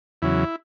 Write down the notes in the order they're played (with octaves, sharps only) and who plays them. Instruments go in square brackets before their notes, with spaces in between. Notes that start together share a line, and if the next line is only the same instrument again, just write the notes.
[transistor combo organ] E2 C#3 F#3 E4